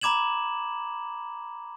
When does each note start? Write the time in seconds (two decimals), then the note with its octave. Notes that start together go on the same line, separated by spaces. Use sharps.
0.01 A#5 B5 D6 G#6 E7 F#7